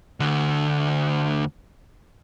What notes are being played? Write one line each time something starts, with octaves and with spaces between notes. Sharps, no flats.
D2 D3